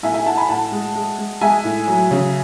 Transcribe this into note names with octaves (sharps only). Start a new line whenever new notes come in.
A2 E5 G#5
E5 G#5
A2 F#5 A5
G#5 B5
A2 F#5 A5
G#3
G#3
G#3
G#3 E5 G#5
A2
F#3
C#3